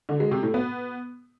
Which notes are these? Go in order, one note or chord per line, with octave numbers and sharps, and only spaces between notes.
D3
G#3
C3
A2
B3